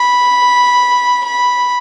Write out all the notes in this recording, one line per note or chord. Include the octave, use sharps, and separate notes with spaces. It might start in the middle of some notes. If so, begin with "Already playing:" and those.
Already playing: B5
B5